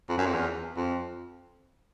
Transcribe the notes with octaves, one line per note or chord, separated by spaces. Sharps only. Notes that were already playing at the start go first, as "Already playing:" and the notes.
F2
F#2
F2
E2
F2